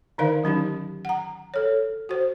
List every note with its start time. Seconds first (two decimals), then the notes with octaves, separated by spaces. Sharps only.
0.18 D3 D#3 D#4 A#4 D5 F5
0.44 F#3 C#4 D#4 G4
1.05 F#5 A#5
1.54 A4 C#5
2.09 F#4 C5